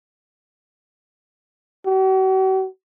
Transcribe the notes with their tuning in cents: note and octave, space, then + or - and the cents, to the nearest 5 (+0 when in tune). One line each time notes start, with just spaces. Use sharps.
F#4 +45